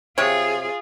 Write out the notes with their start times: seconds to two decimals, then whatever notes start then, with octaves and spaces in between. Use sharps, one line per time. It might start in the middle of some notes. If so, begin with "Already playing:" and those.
0.18 C3 F4 G#4 C#5